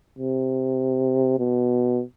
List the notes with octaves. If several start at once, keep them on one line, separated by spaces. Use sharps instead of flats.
C3
B2